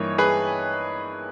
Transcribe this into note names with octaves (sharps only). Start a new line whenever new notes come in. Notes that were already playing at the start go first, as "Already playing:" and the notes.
Already playing: G2 E3 A#3 D#4 C#5
G#4 B4